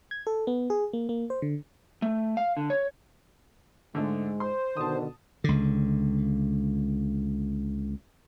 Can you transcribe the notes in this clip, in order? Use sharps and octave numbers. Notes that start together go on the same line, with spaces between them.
G#6
A4
B3
G#4
A#3
A#3
C5
D3
A3
F5
D3
C#5
G#2 D3 G#3 A3
C5 C6
B2 D3 D#3 A5 D#6
C#2 D3